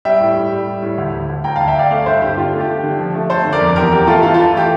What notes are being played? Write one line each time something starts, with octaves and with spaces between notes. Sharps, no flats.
G3 E5 G5
A2
A2
G3
G3
A2
D2
D2
D2
D2 G5 A#5
F5 A5
D2
E5 G5
D2 D5 F5
A3 D5 F5
G2 C5 E5
D3 G4
D3 F4
A3
G4
A3
D3
F3
A3
A3 A4 C5
D3
A#4 D5
F2
E2 G4 A#4
E2 G4 A#4
A3 F4 A4
E3 F4 A4
F4 A4
E3
A3 G4